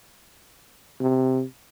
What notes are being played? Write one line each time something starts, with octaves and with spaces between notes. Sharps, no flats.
C3